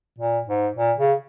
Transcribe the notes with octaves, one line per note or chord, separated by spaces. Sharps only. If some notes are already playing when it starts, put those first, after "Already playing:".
A#2
G#2
A#2
C#3